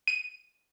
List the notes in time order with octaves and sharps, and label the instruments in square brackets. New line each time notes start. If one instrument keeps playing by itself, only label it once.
[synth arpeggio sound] D#7